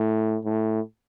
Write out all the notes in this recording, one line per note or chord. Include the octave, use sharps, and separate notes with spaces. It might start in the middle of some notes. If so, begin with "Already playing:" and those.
Already playing: A2
A2